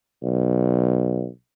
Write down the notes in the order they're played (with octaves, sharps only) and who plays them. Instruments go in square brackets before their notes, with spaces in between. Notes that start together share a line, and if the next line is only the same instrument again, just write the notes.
[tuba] B1